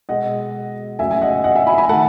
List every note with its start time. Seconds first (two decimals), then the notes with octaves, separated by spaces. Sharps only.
0.09 B2 G#3 B3 D#5 F#5
0.99 F#2 C#3 F#3 A3 E5 G#5
1.11 G#5
1.22 D#5 F#5
1.44 D#5 F#5
1.56 E5 G#5
1.67 G#5 B5
1.78 G#5 B5
1.89 D#3 A3 F#5 A5